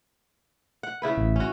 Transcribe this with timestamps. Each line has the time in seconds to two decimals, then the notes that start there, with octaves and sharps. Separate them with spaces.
0.83 F#5
1.02 C#3 E4 B4
1.17 A1
1.36 C#4 F#4